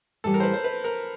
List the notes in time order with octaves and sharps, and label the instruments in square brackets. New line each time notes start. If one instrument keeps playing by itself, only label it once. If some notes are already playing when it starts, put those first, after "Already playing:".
[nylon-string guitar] A2 E3 G3 [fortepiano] A4
[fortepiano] A#4
C5
B4
C5
B4
A#4